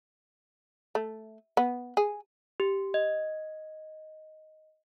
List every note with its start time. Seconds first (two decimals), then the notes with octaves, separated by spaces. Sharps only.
0.95 A3
1.57 B3
1.97 G#4
2.60 G4
2.94 D#5